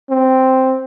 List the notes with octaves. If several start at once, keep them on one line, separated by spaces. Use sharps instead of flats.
C4